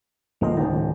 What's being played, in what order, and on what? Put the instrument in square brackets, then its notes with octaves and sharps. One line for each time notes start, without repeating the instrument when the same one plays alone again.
[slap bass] D1 F3 [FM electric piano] A#3 D#5
[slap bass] D1 C#2 F#2 [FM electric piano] D#3